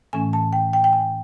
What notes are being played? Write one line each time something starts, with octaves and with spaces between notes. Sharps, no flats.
A2 E3 A3 C#4 G#5
A5
G5
G5
G5
G#5